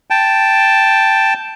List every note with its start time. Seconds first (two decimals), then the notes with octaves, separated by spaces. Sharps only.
0.10 G5 A5